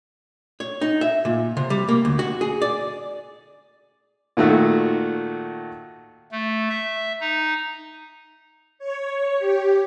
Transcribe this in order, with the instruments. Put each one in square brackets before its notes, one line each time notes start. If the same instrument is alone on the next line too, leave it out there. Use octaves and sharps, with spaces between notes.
[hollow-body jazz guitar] C#5
D#4
E5
A#2
C3
G3
A#3
D2
F#4
G#4
D5
[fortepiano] A#2 D#3 A3 F#4 E6
[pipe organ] A3
E5
D#4
[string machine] C#5
G4